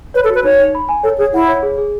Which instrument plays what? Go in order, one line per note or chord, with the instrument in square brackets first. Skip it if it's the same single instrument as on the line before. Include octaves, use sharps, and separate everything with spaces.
[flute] B4 [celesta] C#5
[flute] A4
[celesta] F#4
[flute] B4
[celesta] D#4 [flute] C#5
[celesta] D#4
B5
G#5
[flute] A4 [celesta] C#5
[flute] G#4 [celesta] C#5
[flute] E4 [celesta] F#5
[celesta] C#5
G#4
G#4